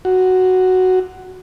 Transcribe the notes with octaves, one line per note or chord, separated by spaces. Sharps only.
F#4